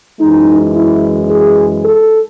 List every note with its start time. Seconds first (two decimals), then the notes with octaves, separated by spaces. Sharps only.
0.19 F#2 E3 G#3 D#4
0.74 E4
1.29 G#4
1.83 A4